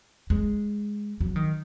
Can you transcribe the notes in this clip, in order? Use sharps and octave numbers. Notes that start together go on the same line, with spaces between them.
G#3
F#3
D#3